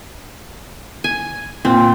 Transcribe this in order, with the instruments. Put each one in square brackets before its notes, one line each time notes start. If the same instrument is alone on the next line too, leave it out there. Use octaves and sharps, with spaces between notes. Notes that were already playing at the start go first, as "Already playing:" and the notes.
[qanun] G#5
[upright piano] A#2 [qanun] C4